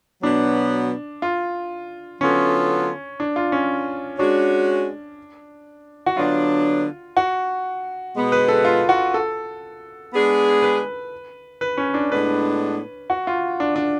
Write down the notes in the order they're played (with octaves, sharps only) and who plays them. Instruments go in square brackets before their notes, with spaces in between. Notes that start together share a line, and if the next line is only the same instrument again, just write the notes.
[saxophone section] B2 F#3 B3 [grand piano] D4
[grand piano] F4
[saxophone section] D3 F#3 B3 F4 A4 [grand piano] C#4
[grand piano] D4
F4
C#4
[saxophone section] G#3 C#4 F#4 [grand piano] D4
[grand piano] F#4
[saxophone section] D3 F#3 B3 D4 [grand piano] F4
[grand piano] F#4
[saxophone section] B2 G#3 B3
[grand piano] B4
A4
F4
F#4
A4
[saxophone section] G#3 B3 D4 G#4
[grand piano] B4
B4
C#4
D4
[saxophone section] A2 G#3 B3 D4 [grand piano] B4
[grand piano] F#4
F4
D4
D4